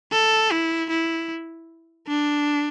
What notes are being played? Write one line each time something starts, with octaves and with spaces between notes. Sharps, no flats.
A4
E4
E4
D4